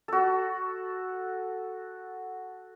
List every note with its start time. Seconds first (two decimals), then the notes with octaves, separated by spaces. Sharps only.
0.08 F#4 A4